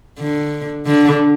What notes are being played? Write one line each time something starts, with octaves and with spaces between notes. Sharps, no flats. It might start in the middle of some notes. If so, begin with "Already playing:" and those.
D3
D3